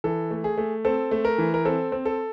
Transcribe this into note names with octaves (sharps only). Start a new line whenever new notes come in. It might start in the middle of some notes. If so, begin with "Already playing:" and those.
E3 A4
A3
G#4
A3
C4 A4
A3
A#4
E3
A#4
C4 A4
C4
A4